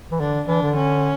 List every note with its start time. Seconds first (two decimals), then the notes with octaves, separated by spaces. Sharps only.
0.12 E3
0.20 D3 D4
0.48 E3 D4
0.63 D3
0.76 C#4